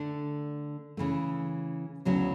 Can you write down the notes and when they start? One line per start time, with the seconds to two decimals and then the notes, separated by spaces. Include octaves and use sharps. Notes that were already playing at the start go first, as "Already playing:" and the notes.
Already playing: D3 A3 D4
0.97 C#3 E3 A3
2.05 D2 C#3 F#3 B3 E4